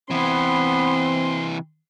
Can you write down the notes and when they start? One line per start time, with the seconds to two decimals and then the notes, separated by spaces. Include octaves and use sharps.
0.11 C3 E3 B3 C4 C6